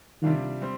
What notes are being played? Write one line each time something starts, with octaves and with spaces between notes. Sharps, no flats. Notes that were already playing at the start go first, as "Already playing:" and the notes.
C3 D#3 G3 D4 F4
G3 C4